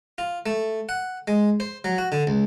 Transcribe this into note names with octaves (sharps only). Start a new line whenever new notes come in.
F4
A3
F#5
G#3
C5
F#3
F#4
D3
C#2